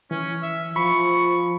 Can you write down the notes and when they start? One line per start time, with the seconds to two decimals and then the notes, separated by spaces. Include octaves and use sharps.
0.11 E3 C#4
0.43 E5
0.76 F3 B5 C#6